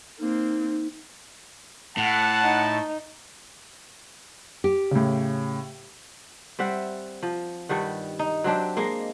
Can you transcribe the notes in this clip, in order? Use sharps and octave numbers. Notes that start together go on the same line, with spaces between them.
A#3 C4 D#4
A2 F#5 A5
D#4
G4
A2 C#3
G3 C4 E5 F#5
F3
G2 D#3 G3 F#5
D#4
F#3 C4 D4 G4
G#3 A#3